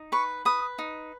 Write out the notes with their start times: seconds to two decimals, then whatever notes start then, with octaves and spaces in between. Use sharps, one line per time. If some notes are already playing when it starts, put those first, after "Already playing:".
Already playing: D#4
0.12 B4 C#6
0.45 B4 D#6
0.78 D#4